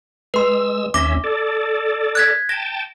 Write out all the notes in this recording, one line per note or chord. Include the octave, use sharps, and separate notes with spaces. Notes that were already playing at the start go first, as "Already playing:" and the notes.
G#3 B4 C6 E6
D#2 C#4 E5 D6 A#6
A4 D5
F#6 G#6 B6
G5 A5 A#6